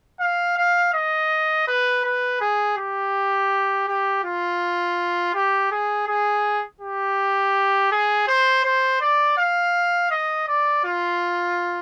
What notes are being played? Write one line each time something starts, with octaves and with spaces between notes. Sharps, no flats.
F5
F5
D#5
B4
B4
G#4
G4
G4
F4
G4
G#4
G#4
G4
G#4
C5
C5
D5
F5
D#5
D5
F4